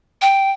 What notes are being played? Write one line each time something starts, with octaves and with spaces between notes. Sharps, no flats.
G5